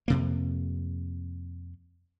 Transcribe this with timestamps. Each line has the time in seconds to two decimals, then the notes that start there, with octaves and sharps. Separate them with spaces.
0.08 F2 C3 A#3